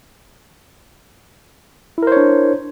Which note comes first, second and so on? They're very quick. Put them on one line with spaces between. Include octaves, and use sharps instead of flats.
E4 A#4 C5 C#5 D4